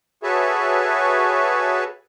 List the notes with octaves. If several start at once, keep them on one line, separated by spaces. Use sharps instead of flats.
F#4 G#4 A4 B4 C#5 E5